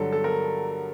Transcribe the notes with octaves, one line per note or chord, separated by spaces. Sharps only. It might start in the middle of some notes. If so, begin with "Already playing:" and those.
Already playing: G2 D3 F#3 A4
A4
A#4